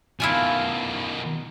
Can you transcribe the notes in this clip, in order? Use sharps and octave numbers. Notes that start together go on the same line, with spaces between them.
B2 D#3 E4 F4 G#5